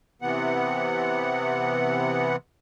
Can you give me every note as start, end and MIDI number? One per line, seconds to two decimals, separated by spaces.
0.22 2.36 48
0.22 2.36 52
0.22 2.36 59
0.22 2.36 78